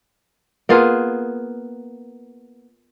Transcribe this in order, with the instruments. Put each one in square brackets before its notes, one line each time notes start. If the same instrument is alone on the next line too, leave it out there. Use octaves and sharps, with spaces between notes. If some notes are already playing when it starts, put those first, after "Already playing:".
[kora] A#3 B3 F4 G#4